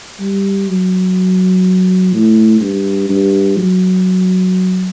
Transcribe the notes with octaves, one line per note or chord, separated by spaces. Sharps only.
G3
F#3
A2
G2
G2
F#3